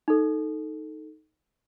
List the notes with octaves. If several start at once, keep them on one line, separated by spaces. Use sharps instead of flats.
D#4 A4